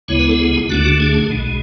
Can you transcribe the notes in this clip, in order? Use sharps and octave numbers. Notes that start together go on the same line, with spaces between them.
D2 C#3 G#3 B3 E4 C#5
B4
A4
G#4
G#4
D2 D3 A3 D4 F#4
F#4
G#4
B1 B2 G#3